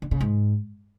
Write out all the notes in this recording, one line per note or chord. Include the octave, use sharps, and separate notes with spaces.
D3
C#3
G#2